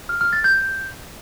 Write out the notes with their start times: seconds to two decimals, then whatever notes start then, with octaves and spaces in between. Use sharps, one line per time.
0.09 F6
0.21 F6
0.33 A6
0.44 G6